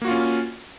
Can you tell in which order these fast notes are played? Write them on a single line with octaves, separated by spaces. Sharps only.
A#3 F#4 F4 C#4